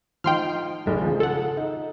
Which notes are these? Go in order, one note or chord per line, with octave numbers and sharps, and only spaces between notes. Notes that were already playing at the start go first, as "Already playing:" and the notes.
F3 D#4 G5 C6 F6
F1 B1 C#3
C#3 F3
A4 F#5
D#4